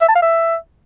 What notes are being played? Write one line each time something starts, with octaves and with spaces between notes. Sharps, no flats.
E5
A5
F5
E5